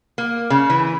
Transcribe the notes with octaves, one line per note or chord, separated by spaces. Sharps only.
A#3
C#3
E3